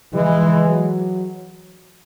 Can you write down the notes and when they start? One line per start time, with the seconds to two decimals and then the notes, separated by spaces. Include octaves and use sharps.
0.14 E3 G#3
0.68 F#3